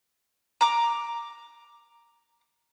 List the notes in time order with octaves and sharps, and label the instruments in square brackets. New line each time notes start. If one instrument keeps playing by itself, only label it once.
[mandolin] A#5 D6